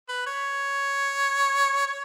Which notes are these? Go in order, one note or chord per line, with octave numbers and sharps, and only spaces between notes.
B4
C#5
C#5